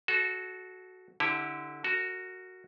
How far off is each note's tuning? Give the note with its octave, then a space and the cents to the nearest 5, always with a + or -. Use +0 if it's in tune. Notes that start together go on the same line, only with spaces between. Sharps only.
F#4 +0 A4 -20
D3 +0 E4 -25 G4 +15
F#4 +0 A#4 -40